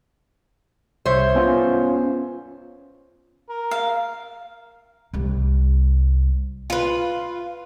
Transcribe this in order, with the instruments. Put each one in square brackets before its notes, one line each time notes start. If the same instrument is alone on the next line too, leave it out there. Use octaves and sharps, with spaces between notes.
[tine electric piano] C2 E5 [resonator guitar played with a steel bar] C5 C#5
[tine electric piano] B3 C#4 F4
[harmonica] A#4
[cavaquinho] F5
[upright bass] C2 G3
[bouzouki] F4 B4